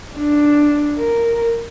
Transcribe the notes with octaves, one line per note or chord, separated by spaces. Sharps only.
D4
A#4